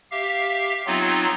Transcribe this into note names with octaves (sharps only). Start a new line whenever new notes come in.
G4 E5 F5
F#3 B3 C4 D#4 F4